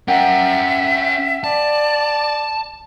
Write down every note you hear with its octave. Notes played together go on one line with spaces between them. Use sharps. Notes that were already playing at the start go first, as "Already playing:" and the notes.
C#4 A#4 E5 F#5 G5
D5 A5